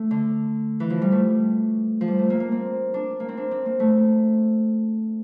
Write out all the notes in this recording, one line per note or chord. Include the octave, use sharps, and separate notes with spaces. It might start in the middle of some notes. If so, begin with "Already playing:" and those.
Already playing: A3
D3
E3
F3
G3
A3
F3
G3
A3
A#3
A#3
C4
D4
A#3
C4
D4
C4
A#3
A3